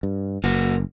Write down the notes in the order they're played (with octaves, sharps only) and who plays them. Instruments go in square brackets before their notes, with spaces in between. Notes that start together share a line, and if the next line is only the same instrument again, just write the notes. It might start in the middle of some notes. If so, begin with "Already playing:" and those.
[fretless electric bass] G2
[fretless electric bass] F#1 [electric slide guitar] A#3 F#4